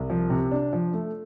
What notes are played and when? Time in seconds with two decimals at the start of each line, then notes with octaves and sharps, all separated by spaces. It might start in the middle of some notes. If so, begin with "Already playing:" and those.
Already playing: C2
0.10 F3
0.30 C3
0.51 D4
0.73 F3
0.93 A3